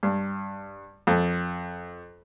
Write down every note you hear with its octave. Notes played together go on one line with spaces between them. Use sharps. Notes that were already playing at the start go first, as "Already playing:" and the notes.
G2
F2